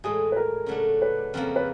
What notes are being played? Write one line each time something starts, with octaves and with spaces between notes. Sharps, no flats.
A2 E3 G#3 G#4
B4
A#4
C#3 F#3 A3 D4
B4
F2 C#3 F3 A#3
B4